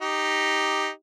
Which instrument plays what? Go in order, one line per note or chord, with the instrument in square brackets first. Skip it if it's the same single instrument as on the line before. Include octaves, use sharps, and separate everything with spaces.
[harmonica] D#4 G4